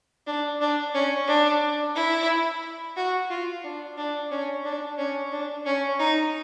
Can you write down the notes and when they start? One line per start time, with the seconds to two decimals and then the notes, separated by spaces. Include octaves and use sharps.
0.27 D4
0.61 D4
0.94 C#4
1.28 D4
1.95 E4
2.96 F#4
3.30 F4
3.64 D4
3.97 D4
4.31 C#4
4.65 D4
4.98 C#4
5.32 D4
5.66 C#4
5.99 D#4